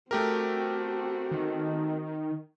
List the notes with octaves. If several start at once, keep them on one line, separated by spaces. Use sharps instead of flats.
A3 C4 F#4 G4 A#4
D#3